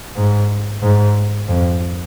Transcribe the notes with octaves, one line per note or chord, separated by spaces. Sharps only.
G#2
G#2
F2